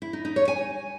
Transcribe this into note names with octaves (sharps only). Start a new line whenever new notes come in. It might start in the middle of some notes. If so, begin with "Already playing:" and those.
E4
D#4
D#4
C#5
G#5